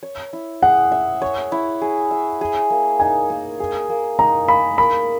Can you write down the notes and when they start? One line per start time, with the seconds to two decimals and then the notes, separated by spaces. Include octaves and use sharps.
0.03 C#5
0.33 E4
0.63 G#4 F#5
0.92 E5
1.22 C#5
1.52 E4
1.82 G#4
2.11 E5
2.41 G#4
2.70 A#3
3.00 D#4 G#5
3.30 A#3
3.60 G#4
3.89 A#3
4.19 D#4 A#5
4.48 A#3 B5
4.78 A#4 B5